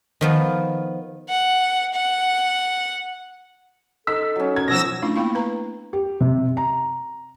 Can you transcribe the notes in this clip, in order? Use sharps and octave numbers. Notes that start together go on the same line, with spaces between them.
D#3 F3 B3
F#5
F#5
D#4 A4 E6 B6
F#3 C#4
A#4 G#6
B2 F3 F#3 C#4 E6 A#6
A3 C#4 D4 E4 F4
A#3 B3 E4 F5 B5
B4 A#5
G4
C3
A#5